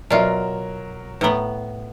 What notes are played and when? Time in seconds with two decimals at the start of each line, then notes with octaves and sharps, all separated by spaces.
0.10 B2 F#3 F4 A#4 D5 E5
1.21 A2 B3 B4 A#5